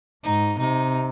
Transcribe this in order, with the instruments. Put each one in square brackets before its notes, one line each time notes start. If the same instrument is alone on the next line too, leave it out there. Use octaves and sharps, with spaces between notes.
[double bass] G#2 [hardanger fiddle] D#4
[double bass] C3 [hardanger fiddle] D#4